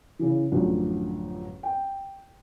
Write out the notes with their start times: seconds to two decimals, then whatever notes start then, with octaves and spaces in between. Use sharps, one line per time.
0.19 C#3 E3
0.51 A1 F#2 D3 F3
1.63 G5